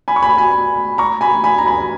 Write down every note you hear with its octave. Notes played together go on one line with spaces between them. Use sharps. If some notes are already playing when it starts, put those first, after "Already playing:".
G#5 B5
C#6
G#5 B5
G#5 B5
A#5 C#6
G#5 B5
G#5 B5
A#5
G#5 B5